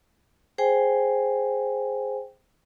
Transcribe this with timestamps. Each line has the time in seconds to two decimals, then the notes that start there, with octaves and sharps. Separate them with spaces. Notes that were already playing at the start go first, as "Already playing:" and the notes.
0.58 G#4 C5 G5 G#5